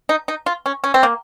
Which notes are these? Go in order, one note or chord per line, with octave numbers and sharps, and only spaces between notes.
D#4
D#4
F4
C#4
C#4
C4
A#3